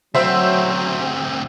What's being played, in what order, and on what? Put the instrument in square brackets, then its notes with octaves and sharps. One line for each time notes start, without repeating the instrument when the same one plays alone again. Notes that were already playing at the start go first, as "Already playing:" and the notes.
[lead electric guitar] D2 C4 [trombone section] F#3 [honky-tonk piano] C5 E5